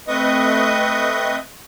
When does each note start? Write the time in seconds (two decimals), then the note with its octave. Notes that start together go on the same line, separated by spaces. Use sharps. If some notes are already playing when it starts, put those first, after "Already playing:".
0.08 A3 C4 B4 D#5 C#6 D#6